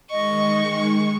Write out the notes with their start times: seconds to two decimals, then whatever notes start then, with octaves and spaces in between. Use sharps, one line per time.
0.11 D#3 G#3 D#5 C#6